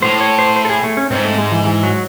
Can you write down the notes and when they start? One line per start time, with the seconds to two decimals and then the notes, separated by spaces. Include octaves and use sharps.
0.02 A2 C5
0.20 C#5
0.39 C5
0.56 C5
0.65 A4
0.69 G#4
0.84 A3
0.97 C#4
1.11 G#2 C4
1.24 A3
1.38 G#3
1.52 E3
1.64 E3
1.83 F#3